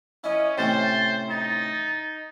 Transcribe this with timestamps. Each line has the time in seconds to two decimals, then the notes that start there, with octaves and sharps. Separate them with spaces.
0.24 C#4 E4 D#5
0.58 A2 C3 C#4 C5 A6
1.29 D#4 A6